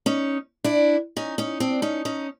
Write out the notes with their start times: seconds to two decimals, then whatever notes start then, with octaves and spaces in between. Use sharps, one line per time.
0.06 C#4 D#4
0.64 D4 E4
1.17 C#4 D#4
1.38 C#4 D#4
1.60 C4 D4
1.82 C#4 D#4
2.05 C#4 D#4